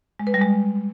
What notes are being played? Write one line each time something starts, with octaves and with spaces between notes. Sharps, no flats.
G#3
B4
G3
G#3